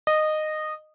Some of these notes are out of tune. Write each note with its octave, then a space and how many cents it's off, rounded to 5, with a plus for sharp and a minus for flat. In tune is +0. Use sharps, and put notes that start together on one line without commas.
D#5 -15